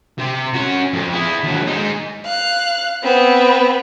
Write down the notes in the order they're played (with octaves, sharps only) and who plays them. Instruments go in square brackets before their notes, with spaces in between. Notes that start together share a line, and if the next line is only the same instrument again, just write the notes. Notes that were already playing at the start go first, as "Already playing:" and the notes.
[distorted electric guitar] C3
C#4 F#4
F2
E4 G#4
D#2 F#3
G#3 D#4
[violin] F5 F#6
B3 C4